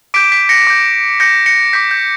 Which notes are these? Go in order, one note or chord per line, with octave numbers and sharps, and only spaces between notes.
D6 G6 B6 D7
B6
A#6 C#7
D6 G6
D6 G6 A#6 C#7
A#6 C#7
D6 G6 B6
G6